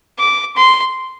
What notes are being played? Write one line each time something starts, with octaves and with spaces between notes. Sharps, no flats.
D6
C6